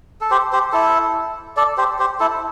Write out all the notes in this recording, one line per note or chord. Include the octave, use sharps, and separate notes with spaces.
A4
G4 C5
G4 C5
E4 A4
A4 D5
G4 C5
G4 C5
E4 A4